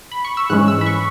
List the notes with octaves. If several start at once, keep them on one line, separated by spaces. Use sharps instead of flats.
B5
C#6
E6
G#2 E3 G#3 C#4 F#6
E6
B5
C#6